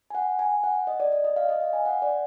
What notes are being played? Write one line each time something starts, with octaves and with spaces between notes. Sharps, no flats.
G#5
F#5
G#5
F#5
D#5
D5
D5
D#5
F5
D#5
F5
G#5
F#5
D5